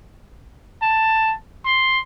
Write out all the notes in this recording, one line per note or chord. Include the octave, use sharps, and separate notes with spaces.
A5
C6